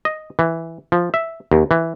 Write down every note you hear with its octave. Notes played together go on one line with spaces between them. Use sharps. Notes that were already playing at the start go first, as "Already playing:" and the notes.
D#5
E3
F3
E5
D#2
E3